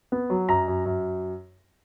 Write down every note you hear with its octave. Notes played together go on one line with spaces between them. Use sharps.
B3
F#3
F#2 A#5
F#2
F#2